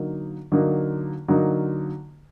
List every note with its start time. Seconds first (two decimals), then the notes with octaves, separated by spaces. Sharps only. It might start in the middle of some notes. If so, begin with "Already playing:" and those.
Already playing: D3 F#3 A#3 D#4
0.52 D3 F#3 A#3 D#4
1.28 D3 F#3 A#3 D#4